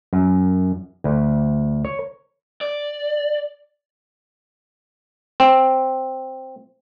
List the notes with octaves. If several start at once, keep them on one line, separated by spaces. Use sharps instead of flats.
F#2
D2
C#5
D5
C4